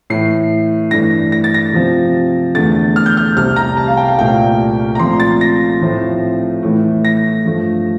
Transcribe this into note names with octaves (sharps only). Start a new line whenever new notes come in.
A2 E3 A3 C7
G2 E3 A3 D4 A#6
A#6
A6
A#6
C3 F3 C4
E2 D3 A3 A6
F6
G6
F6
C2 C3 G3 F6
A#5
A5
F5
G5
F5
C2 A#2 A3 G5
A#5
A#2 F3 A3 C4 C6
A6
A#6
A2 F3 A3 C4
A2 E3 A3
A#6
G2 F3 A3